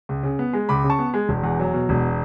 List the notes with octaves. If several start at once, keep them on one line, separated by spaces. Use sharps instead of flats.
C#2
C#3
B3
G#3
C#2 B5 D6
C#3
A5 C#6
B3
G#3
E1
E2
F#3
B2
E1